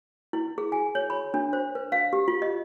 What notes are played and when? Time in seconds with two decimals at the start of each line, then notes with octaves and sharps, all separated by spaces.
0.33 E4
0.58 G#4
0.72 G#5
0.95 C#5
1.10 B5
1.34 D4
1.53 C5
1.75 B4
1.92 F5
2.13 G4
2.28 F4
2.42 D#5